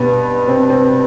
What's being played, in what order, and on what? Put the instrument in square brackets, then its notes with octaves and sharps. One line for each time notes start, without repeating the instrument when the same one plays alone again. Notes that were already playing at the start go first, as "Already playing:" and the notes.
Already playing: [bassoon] G2 [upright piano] B2 B3
[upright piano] C3 C4
C3 C4